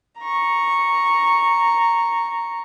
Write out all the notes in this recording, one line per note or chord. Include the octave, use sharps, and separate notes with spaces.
A#5 C#6